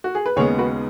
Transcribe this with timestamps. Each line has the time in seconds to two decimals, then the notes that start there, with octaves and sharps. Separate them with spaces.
0.04 F#4
0.15 G#4
0.26 B4
0.36 D#2 C#3 G#3 B3 G#4 C#5
0.58 F#4 B4